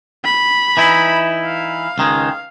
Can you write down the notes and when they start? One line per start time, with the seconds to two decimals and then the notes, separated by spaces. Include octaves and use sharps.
0.25 B5
0.77 E3 D#4 E4
1.46 F5
1.98 C#2 D#3 G#3